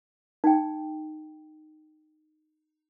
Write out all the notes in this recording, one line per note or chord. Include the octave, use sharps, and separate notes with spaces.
D#4 G5